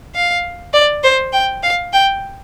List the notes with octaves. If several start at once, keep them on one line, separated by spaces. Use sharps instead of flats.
F5
D5
C5
G5
F5
G5